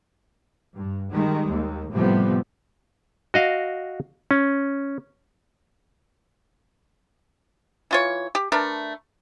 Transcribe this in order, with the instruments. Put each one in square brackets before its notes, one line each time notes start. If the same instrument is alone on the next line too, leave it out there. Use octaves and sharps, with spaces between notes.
[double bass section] G2
D#3 G3 G#3
D#2
A2 C3 F3 G3 B3
[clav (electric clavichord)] F#4 D#5 F5
C#4
[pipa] E3 F4 C#5
G4
A3 D4 A#4 B4